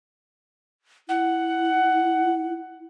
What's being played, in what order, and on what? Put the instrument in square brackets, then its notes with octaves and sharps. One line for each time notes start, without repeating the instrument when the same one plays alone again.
[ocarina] E4 [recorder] F#5